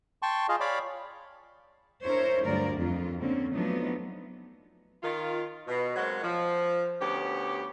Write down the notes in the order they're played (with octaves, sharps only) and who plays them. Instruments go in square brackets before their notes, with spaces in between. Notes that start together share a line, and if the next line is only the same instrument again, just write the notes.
[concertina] G5 A5 C6 C#6
F4 G#4 D#5 F5
C#5 D5 F5 B5 D6
[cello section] D4 E4 A#4 C5 C#5
D2 G2 F#3 F4 A#4 D5
F2 F4
D3 A#3 C4 C#4
F3 F#3 A3 B3 D4 D#4
[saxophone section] D#3 F4
B2
F#3 G#3 A#3 C4 F#4
F3
D2 B3 C#4 G4